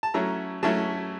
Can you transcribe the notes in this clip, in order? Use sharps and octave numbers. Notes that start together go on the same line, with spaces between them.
A5
F#3 A3 C#4 E4 A#5
F#3 A3 C#4 E4 A5